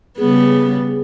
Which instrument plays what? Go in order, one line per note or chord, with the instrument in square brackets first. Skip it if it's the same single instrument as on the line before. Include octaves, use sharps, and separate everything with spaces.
[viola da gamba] C#3 G3 B3 [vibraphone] G#4